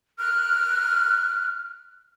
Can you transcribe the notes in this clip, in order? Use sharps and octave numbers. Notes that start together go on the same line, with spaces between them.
F6 F#6